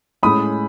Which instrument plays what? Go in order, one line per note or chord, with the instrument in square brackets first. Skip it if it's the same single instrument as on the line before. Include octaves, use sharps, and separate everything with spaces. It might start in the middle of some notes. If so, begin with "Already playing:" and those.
[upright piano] A2 G#3 C#4 [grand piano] B5 D#6